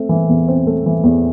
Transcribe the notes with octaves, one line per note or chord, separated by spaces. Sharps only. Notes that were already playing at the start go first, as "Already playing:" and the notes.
Already playing: A3 C4
E3
E2
C4
A3
E3
E2